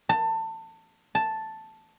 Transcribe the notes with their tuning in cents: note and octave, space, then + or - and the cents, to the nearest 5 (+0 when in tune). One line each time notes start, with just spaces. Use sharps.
A5 +25
A5 +0